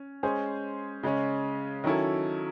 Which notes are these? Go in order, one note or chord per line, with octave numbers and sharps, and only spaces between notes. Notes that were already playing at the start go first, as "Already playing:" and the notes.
Already playing: C#4
G#3 C#4 G#4 C5
C#3 G#3 C#4
D#3 F#3 C#4 E4 A4